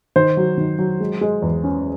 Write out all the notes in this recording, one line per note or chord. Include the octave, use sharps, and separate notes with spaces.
D#3 C5
F#3
D#3
F#3
G#3
G#3
E2
C#4